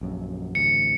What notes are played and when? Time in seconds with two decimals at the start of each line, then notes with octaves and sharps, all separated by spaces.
0.01 A#1 F#2
0.55 A1 D2 C#7